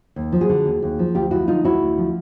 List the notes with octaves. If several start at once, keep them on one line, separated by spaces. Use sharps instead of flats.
D#2
F3
F#4 G#4
D3
D#2
D#2
F3
D2 F4 G4
F3 E4 F#4
D3 D#4 F4
D2 E4 F#4
D2
F3